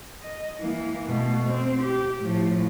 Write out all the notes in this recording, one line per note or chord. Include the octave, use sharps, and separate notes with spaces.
D#5
E3 A#3
B2 A3
C4
G4
A2 F3